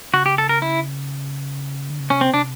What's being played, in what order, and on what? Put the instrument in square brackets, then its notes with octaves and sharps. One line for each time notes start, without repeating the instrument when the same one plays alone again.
[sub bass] C#3 [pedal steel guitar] F#4
[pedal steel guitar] G4
A4
A#4
E4
[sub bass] D3
C#3
[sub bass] C3 [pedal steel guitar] C#4
[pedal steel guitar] C4
[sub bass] C3 [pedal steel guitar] D4